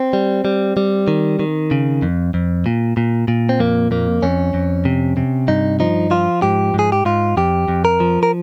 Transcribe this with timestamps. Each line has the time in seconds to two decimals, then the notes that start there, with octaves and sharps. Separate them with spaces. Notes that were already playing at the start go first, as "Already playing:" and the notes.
Already playing: C4
0.13 G3
0.45 G3
0.77 G3
1.08 D#3
1.40 D#3
1.71 C#3
2.02 F2
2.34 F2
2.66 A#2
2.97 A#2
3.28 A#2
3.49 C4
3.60 F2 A#3
3.91 F2 A#3
4.22 F2 C#4
4.54 F2
4.85 C3
5.17 C3
5.48 G2 D#4
5.80 F3 D#4
6.11 F3 F4
6.42 G#2 G4
6.74 G#2 G#4
6.92 G4
7.05 G#2 F4
7.37 F2 G4
7.68 F2
7.85 A#4
8.00 F3
8.23 A#4